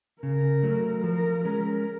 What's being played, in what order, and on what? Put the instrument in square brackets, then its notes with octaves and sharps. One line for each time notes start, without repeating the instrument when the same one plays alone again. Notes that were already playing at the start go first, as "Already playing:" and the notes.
[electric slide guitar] C#3 [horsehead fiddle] A#4
[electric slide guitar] F#3 A3
[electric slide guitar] F3 [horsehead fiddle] A#4
[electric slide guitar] G#3 C#4 [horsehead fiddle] A#4